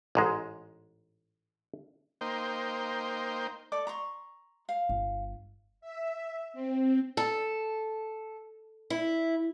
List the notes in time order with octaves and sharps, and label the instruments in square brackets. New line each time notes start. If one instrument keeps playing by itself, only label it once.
[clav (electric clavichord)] A1 G#2 G#3
[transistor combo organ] A#3 D#4 C5 G5
[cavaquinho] A4 D5 D6
A#5 C6 C#6
F5
[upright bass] G1
[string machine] E5
C4
[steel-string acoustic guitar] A4
E4